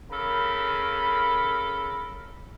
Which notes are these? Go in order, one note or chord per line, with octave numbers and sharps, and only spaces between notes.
C#3 A4 A#4 B5